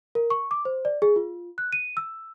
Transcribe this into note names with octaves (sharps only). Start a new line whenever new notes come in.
A#4
C#6
D6
C5
D5
G#4
F4
F#6
D#7
E6